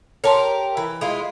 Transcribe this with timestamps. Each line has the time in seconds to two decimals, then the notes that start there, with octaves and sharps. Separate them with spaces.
0.24 G4 A#4 C#5 A5 C6
0.77 E3
1.01 G#3 E4 F4